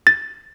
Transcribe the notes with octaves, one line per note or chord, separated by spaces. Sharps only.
A6